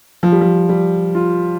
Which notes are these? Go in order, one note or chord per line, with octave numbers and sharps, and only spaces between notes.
F3
G3
F3
G3
F4